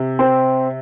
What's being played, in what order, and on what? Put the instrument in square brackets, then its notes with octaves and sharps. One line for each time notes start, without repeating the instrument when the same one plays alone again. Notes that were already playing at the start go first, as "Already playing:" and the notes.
Already playing: [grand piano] C3
[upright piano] C4